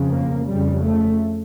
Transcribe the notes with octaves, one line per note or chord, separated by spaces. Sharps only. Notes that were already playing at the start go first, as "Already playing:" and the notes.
Already playing: F2 C#3
A#3
F2 C#3 G3
A3